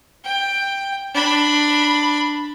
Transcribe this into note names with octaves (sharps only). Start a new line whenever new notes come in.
G5
D4 B5